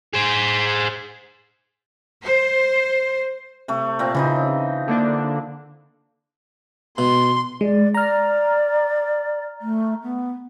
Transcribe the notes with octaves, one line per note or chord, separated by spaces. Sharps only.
G#4 C5
C5
C3 A3
A#2 C4
C#3 E3 F3 D#4
D3 A#3 D4
B2 C6
G#3 D5
D5 A#5 F6
A3
B3